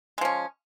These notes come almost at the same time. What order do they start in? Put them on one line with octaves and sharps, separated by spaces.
G#3 F3 C#4